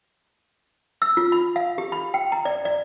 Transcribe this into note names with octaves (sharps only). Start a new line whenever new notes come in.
E6
F4
B5
F5
G4
B5
G5
A#5
D5
D5